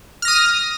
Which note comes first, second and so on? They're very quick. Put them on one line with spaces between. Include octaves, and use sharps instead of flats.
F6 A#6 D#6